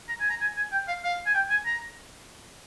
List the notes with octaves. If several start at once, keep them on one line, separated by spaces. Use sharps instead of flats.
A#5
G#5
A#5
G#5
G#5
G5
F5
F5
G#5
G5
G#5
A#5